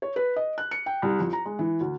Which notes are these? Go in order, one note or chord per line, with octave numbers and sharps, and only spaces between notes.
C#5
B4
D#5
F#6
C#7
G5
C2
F2
A#5
G#3
E3
D2